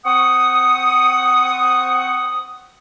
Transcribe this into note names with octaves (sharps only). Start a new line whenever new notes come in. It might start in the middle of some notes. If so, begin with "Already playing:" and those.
C4 F#5 C#6 D#6